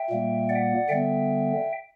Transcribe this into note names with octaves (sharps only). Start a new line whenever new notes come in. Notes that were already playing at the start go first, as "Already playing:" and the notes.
Already playing: E5 G5
A#2 G3 A#3
D5 F#5
D3 G3 B3 E5 G5